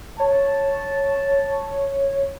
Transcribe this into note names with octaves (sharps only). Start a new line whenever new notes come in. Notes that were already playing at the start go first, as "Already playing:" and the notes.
C#5 A5